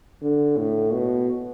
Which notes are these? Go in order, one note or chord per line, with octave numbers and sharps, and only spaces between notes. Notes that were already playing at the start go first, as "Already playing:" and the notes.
D3
A2
B2